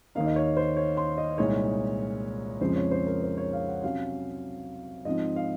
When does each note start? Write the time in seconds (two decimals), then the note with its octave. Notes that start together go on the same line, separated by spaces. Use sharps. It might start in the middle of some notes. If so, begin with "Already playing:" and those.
0.15 D#2 D#3 A#3 D#4 F5
0.26 D#5
0.36 C#5
0.57 C5
0.77 C#5
0.97 C6
1.18 D#5
1.38 C2 A#2 G#3 D#4 C#5
2.61 F2 C#3 F3 G#3 C#4 C5
2.76 C#5
2.91 C5
3.07 A#4
3.23 C5
3.37 C#5
3.53 F5
3.68 F#5
3.83 C3 F#3 C#4 F5
5.05 G#2 F3 C4 D#5
5.36 F5